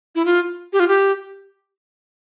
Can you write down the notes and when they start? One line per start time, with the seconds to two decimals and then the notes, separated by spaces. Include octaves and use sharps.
0.15 E4
0.25 F4
0.73 G4
0.80 F4
0.88 G4